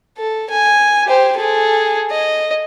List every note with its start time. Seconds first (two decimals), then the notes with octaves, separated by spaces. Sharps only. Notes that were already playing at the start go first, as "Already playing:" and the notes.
0.18 A4
0.50 G#5
1.06 G4 C5
1.37 G#4 A4
2.11 D#5